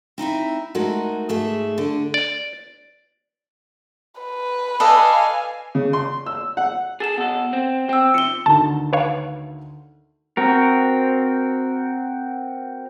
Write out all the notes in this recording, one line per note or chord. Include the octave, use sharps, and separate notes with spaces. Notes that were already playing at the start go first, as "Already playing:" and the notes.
C4 D#4 E4 E5
G#3 A3 D#4 F#4 A#4
G#2 A3 G#4 E5
D3
D5
B4
A4 D5 D#5 F5 G#5
C#3
C6
E6
F#5
G#4 A4 A6 E7
B2 A4 F#5
C4
C4 G5 E6
C3 F3 C#7 G7
D2 D3 D#3 A5
B4 C#5 F5
C4 F#4 A#4